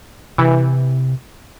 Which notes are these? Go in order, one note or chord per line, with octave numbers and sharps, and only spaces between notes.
C3 E3